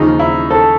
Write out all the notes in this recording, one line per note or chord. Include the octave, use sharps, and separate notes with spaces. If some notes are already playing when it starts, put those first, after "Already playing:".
Already playing: D#2 C#3 F3 D#4
E4
A4